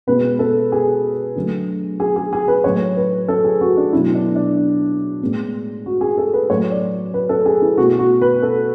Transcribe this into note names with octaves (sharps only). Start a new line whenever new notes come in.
B2 G#3 B3 B4
A4
G#4
D3 F#3 A3
G#4
G#4
G#4
B4
A2 F#3 A3 C#5
B4
A4
G#4
F#4
D4
B2 F#3 A3 E4
D4
D4
A2 G#3 B3
F#4
G#4
A4
B4
A2 F#3 A3 C#5
D5
B4
A4
G#4
E4
B2 A3 F#4
F#4
B4
A4